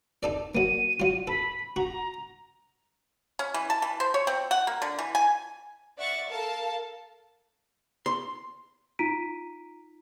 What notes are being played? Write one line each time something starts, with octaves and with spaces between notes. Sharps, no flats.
D#4 A4 D5
F#3 A#3 D#7
F#3 F4
A4 B5
F#4 A#5
C#4
E3
A5
E3
C5
C#5
C4
F#5
A#3
D3
E3
G#5
D5 E5 F#5 C#6 A6
A4 A#4 F5 A5
C6
D#4 F4 A#5 B6 D7 D#7